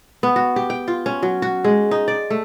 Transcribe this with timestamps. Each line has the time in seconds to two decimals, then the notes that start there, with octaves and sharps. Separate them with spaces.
0.23 B3
0.36 F#4
0.56 G4
0.70 G5
0.88 F4
1.06 C#4
1.23 F#3
1.42 F#4
1.64 G#3
1.91 D#4
2.08 D5
2.30 A3